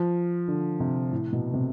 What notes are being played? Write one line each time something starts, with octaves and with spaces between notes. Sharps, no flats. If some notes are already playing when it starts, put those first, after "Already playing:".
Already playing: F3
D3
C3
A2
B2
C3